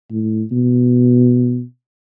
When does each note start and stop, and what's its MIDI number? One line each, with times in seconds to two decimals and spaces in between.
0.11 0.43 45
0.52 1.63 47